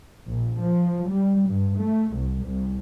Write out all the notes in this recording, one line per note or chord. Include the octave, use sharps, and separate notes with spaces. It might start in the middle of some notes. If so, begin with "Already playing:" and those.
A#1
F3
G3
G2
A3
C2
C2